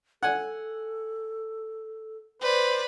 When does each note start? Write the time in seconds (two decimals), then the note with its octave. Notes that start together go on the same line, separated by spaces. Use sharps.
0.23 A4 F#5 G#5
2.42 B4 C5 D5